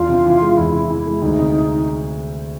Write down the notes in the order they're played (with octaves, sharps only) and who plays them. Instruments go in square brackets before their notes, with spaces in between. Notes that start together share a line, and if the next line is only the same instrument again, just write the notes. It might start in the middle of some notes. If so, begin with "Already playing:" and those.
Already playing: [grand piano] E2 D4 [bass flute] F4
[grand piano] C3
E3
G#3
[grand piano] E2 [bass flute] E4
[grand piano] C3
E3
G#3
[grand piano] D2 [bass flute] D#4
[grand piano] C3